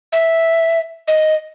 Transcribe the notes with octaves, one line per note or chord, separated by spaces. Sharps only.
E5
D#5